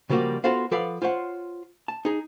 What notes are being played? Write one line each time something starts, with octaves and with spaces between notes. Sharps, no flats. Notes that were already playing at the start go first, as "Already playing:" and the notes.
C#3 F3 G3 A#3 F#4 G4
B3 F4 F#4 A4 C5 F5
F3 A4 B4 D5 F5 F#5
F4 C5 C#5 F#5
A5
D#4 G#4